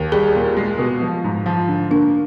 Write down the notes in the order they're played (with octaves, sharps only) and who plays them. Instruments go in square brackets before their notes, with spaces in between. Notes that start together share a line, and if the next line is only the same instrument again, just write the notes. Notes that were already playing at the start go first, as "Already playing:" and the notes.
Already playing: [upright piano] D#2
[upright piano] G3 [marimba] G#4
[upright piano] A#2
G#3
B2
F3
G#2
F3
D3
[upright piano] A#3 [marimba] D4